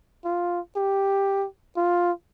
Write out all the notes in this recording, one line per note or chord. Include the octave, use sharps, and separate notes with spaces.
F4
G4
F4